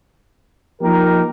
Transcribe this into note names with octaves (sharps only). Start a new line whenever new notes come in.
F3 A#3 D#4 G4 A#4